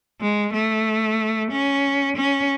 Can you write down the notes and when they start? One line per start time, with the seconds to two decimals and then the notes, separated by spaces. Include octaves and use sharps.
0.21 G#3
0.54 A3
1.51 C#4
2.16 C#4